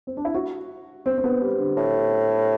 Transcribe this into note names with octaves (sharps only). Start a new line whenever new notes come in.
C4
D4
E4
F#4
C4
C4
B3
G3
D3
A2